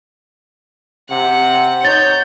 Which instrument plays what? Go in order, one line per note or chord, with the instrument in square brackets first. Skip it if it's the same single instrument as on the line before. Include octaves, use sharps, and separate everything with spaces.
[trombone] C3 [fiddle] F#5
[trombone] D#4 [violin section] C#5 G6 [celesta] A6